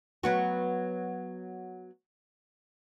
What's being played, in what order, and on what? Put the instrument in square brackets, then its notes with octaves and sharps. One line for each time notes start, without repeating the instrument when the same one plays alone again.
[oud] F#3 B3 F#4